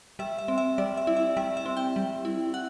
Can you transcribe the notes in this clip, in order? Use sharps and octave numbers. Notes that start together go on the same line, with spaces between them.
G3 E5
E5
C4
E5
G3 D5
E5
E4
E5
G3 E5
E5
C4
G5
G3
E4
F#5